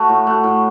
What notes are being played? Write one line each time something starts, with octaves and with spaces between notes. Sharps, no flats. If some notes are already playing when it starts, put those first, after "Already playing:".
Already playing: A3 F#4
A2
A3 F#4
A2